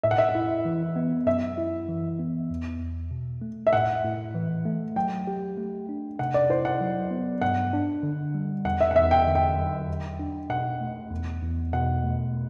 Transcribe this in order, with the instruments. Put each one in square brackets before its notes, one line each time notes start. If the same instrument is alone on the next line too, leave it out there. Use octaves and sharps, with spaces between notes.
[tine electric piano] A2 [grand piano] E5
[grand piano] F#5
E5
[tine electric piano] E4
E3
B3
[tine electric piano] F#2 [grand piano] E5
[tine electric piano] E4
E3
B3
E2
E2
B2
A3
[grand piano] E5
[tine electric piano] A2 [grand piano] F#5
[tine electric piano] A2
E3
A3
[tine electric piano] F#3 [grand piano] G5
[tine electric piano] G4
A3
D4
[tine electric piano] C3 [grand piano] F#5
[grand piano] D5
[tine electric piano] E4 [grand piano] C5
[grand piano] F#5
[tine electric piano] F#3
B3
[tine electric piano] G2 [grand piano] F#5
[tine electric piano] D4
D3
G3
[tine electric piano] E2 [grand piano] F#5
[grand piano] E5
F#5
[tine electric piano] E2 [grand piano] E5
[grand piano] G5
[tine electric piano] D3
[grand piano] G5
[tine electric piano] F#3
E2
D4
[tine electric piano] B2 [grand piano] F#5
[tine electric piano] A3
E2
E2
[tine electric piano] B2 [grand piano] F#5
[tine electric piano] A3